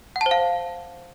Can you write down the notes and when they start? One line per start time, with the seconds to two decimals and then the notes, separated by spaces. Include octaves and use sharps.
0.16 F#5
0.21 A5
0.26 C5
0.31 F5